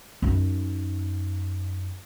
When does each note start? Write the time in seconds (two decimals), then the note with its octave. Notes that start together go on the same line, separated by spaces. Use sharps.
0.22 F#2 D#4